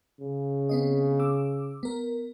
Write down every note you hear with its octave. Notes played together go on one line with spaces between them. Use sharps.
C#3
B3 C4 D#5
D6 E6
B3 A#4